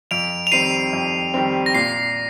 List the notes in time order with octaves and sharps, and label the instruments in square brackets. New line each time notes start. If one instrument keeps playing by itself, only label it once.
[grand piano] F2 [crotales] D7 F7
[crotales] F7
[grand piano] D#3 G3 C4 [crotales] C7 D#7
[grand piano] F2
D#3 G3 C4
[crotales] A#6
[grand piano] A#2 [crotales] C7